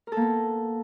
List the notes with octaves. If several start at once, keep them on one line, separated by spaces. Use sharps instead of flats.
A#3 B3 A4 A#4